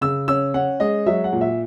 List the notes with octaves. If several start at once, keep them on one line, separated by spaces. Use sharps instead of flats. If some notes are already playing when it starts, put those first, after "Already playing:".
C#3 E6
C#4 E6
C#4 F#5
G#3 D#5
F#3 E5
F#5
A#2
E5